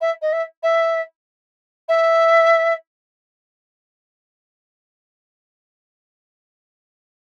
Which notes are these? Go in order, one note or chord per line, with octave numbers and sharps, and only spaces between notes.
E5
D#5
E5
E5
E5